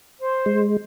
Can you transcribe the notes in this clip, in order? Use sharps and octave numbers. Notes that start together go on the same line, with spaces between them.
C5
G#3